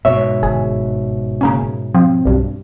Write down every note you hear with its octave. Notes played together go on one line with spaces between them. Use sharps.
G#2 B2 C#5 E5
G1 G#4
C#3 A#3 C#4
F3 C4
B1 G2